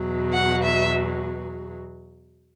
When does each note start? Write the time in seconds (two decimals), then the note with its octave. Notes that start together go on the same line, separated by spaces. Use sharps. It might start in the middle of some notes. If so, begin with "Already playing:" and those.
Already playing: E2 B2 F#3
0.34 F#5
0.65 E5